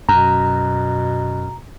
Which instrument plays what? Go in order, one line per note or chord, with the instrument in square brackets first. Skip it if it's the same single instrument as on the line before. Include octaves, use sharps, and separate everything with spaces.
[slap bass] F#2 [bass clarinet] B2 [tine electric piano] A#5